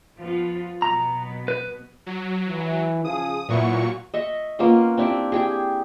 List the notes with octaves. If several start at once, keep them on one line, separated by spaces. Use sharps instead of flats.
F3 B3 F4
B2 F#3 B3 A#5
B4
F#3
E3
C#3 F3 G#4 D#6
A#2 F#3 B3 E4 C#6
D#5 E5 C#6
A#3 B3 C#4 F4
C4 D4 E4 G4
E4 G4 G#4